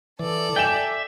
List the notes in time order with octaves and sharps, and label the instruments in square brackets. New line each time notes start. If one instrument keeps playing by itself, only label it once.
[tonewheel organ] E3 [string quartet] A4 D5
[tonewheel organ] E5 [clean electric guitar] G5 [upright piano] G#5 E7